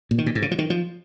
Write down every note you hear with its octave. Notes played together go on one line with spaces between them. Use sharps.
A#2
D#3
A#2
G#2
C#3
F3
D#3
F3